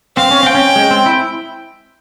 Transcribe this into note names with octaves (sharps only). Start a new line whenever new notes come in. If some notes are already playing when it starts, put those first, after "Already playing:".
C4 F5
C#4
C4 G5
C#4
G#3
C4
E4